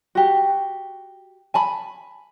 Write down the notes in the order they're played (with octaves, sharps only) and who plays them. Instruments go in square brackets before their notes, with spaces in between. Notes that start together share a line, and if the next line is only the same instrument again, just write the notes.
[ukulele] F#4 G4
G#5 A5 B5